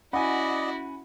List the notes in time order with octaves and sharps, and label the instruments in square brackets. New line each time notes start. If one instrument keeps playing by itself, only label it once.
[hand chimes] C#4 B5 [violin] E4 F#4 [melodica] D5 D#5 [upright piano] F#5 G#5